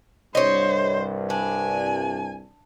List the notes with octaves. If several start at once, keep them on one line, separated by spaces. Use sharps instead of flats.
C2 G2 C5 C#5 D#5
D4 G#5